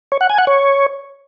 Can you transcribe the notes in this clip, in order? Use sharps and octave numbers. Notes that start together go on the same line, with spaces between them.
C#5
F#5
G#5
F#5
C#5